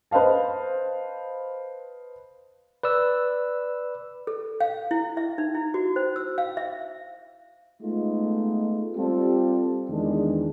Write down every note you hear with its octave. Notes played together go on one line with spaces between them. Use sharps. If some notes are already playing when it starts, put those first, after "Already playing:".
B4 C5 D#5 F5 A5
B4 D5 E6
A4
F5
E4
E5
D#4
E4
F#4
C5
E6
F5
E5
G#3 A3 B3 D#4 F4
G3 C4 F4 G4 A4
E2 D#3 E3 G#3 D4